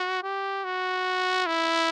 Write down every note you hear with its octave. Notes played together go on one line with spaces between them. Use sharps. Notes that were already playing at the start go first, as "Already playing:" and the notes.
Already playing: F#4
G4
F#4
E4